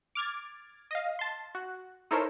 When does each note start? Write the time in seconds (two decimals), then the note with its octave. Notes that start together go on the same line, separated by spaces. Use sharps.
0.15 D6 F6 G#6 A6
0.91 D#5 F5
1.19 A5 C6
1.55 F#4
2.11 D#4 E4 A4 A#4 C5 C#5